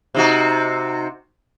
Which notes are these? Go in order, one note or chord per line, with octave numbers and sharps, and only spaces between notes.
C3 D#4 F#4